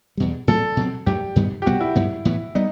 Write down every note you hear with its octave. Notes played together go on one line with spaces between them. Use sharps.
E2 B2 G3
A2 F#3 A3 C4 A4
B2 F#3 C4
F#2 F#3 A3 G4
G2 D#3 G3 B3
G4
C2 B2 G3 B3 F#4
E4
G2 F#3 B3
A2 E3 B3
G3 B3 D#4